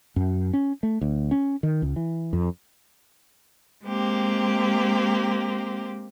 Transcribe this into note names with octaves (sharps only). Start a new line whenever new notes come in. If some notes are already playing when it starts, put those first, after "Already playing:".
F#2
C#4
A3
D2
C#4
D#3
C#2
E3
F2
G#3 A#3 C4 G4